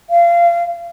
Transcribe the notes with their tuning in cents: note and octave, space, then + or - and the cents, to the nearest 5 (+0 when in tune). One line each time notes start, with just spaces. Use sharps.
F5 -25